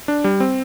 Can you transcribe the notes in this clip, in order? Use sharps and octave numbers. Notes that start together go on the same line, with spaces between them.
D4
G3
C4